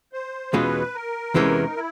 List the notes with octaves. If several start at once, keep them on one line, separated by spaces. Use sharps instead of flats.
C5
E2 B2 G#3 C#4 F4 B4
A#4
E2 C3 E3 G#3 C#4
D#4
E4